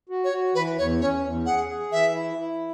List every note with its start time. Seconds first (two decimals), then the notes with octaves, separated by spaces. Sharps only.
0.09 F#4
0.24 C#5
0.32 F#4
0.55 E3 B4
0.78 E2 C#5
1.01 C#4 C#5
1.24 E2
1.46 G#4 F#5
1.69 G#4
1.92 E3 E5
2.14 E4
2.38 E4